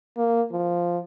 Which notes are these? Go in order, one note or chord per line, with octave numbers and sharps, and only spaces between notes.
A#3
F3